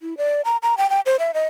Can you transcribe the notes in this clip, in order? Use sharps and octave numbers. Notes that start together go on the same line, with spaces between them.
E4
D5
A#5
A#5
G5
G5
C5
E5
D#5